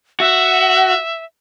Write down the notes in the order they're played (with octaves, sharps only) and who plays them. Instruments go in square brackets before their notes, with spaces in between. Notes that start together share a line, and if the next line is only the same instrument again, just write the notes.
[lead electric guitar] F#4 [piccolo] E5